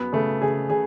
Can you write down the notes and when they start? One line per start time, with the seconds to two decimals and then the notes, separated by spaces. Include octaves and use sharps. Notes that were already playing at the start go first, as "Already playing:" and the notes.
Already playing: F#2 B3
0.13 C#3 A3
0.42 C#3 G#4
0.70 C#3 G#4